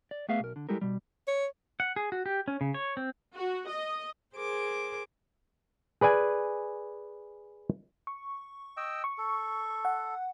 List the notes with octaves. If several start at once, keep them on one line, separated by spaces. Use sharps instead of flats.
D5
A3 B3 G#4 E5 F5
B1 A#4
D3
G3 G#3 E4 G4 A4 A#4
B2 G3
C#5
F#5
G#4
F#4
G4
C#4
C#3
C#5
C4
F#4
D#5
G#4 A#4 C5 D6
G#4 B4 D5 G#5
C#6
D#5 G5 E6
C#6
A4
F#5